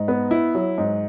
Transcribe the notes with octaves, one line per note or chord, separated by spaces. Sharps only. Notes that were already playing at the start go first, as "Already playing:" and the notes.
Already playing: G#2
B3
E4
F#3
G#2